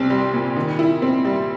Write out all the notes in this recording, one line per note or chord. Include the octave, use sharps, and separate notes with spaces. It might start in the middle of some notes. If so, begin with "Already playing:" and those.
Already playing: C2 C4
G3
A#2
D#3
E4
C4
G3